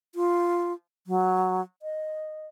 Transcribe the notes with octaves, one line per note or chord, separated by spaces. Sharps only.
F4
F#3
D#5